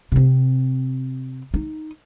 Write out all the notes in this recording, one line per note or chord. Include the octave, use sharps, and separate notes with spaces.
C3 C4
D#4